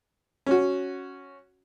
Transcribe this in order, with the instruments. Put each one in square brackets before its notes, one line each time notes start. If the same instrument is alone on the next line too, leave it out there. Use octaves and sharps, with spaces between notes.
[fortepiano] C#4 F#4